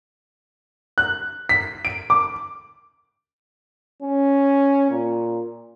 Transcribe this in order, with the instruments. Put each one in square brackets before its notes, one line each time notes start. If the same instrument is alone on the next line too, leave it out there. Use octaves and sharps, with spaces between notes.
[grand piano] F#6
B6
D7
D6
[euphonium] C#4
A#2